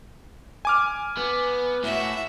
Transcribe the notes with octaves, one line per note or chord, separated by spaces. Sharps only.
G#5 D6 F6
B3
A2 F#4 E5